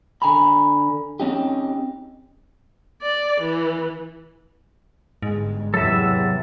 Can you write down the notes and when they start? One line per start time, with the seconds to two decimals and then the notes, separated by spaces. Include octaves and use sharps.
0.22 D3 G#5 A#5 B5
1.20 C4 C#4 D#4 G4
3.02 D5
3.41 E3
5.22 G1 G#2 G#3
5.74 E2 C3 F#3 A4 E5